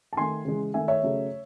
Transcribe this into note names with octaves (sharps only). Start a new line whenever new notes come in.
A5
D#3 A3 G#5 C6
C#3 E3 G#3
D#3 A3 E5 G#5
C#5 E5
C#3 F#3 A3